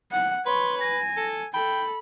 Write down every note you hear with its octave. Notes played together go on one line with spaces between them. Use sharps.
F#5
B4 C#5 B5 C6
G#5 A#6
A4
A4 G5 B5